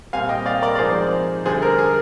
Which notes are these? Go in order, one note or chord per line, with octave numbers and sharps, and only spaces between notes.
C2 A#2 G3 C4 F5 G#5
D#5 G5
D5 F5
A#4 D5
D5
G#2 F3 C4 D#4 G#4 C5
D2 D3 G3 D4 G#4 C5
A#4
G#4